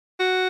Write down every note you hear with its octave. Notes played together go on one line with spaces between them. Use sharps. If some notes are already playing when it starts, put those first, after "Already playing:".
F#4